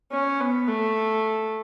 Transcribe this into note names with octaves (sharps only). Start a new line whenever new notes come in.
C#4
B3
A3